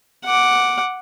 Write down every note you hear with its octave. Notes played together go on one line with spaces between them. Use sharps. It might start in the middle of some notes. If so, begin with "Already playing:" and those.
F#5 D6